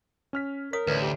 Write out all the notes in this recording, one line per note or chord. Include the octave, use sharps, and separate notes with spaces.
C#4 F6 B6
A#4 C#5 D#6 B6
A1 D2 B4 C#5
G4